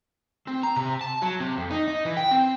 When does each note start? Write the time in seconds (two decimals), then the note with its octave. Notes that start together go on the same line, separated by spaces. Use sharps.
0.47 C4
0.63 A#5
0.77 C3
1.01 A5
1.22 F#3
1.40 C3
1.57 F2
1.71 D#4
1.88 D#4
2.05 E3
2.17 G5
2.31 C4